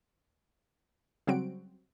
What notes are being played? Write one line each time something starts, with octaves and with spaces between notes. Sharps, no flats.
C#3 F#3 G3 C4 F#4 D7